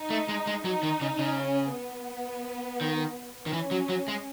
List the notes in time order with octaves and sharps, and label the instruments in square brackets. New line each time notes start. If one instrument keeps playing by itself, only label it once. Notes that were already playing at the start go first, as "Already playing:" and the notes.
Already playing: [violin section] D#4
[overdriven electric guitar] A3
G#3
G#3
[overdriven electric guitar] F#3 [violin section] D#4
[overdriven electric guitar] D#3
C#3
C#3
[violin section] C#4
B3
[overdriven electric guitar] D#3
D#3
[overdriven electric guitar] E3 [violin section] C#4
[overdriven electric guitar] F#3
F#3
G#3